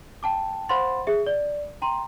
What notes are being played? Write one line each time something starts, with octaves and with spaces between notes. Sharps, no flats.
G5 A5 D6
C5 F5 F#5 B5 C6 A6
G#4 E5
D5
G5 A#5 C6